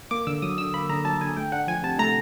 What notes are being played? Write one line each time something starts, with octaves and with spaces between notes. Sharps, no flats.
A#3 D6
D3 E6
F#3 D#6
D3 E6
A#3 B5
D3 A#5
F#3 A5
D3 G#5
A3 G5
D4 F#5
F3 G#5
C3 A5
A3 A#5